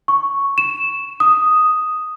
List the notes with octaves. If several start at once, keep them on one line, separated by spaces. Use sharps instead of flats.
C#6
E7
D#6